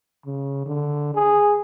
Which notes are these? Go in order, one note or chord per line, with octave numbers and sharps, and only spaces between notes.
C#3
D3
G#4